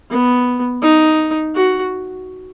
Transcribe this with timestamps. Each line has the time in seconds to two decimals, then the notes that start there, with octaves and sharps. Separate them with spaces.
0.10 B3
0.83 D#4
1.56 F#4